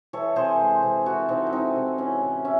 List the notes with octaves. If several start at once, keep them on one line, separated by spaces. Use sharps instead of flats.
E3 A4 C#5
C3 G#4 C5
G#3
C3
E3 F#4 A4
C3 C4 D#4
E4
G#3 C4 D#4
C3
E3 C#4 E4
A2
A3 C#4 E4